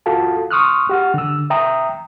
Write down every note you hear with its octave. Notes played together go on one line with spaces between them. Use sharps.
F4 F#4 A4 F5 A5
C6 C#6 D#6 F6 F#6
G4 F#5 F6
D3 E6
E5 G5 A#5 D#6